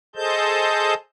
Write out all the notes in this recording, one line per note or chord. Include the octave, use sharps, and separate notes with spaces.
G#4 A4 C5 D#5 A5 G6